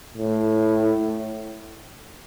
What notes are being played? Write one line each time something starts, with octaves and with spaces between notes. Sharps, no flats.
A2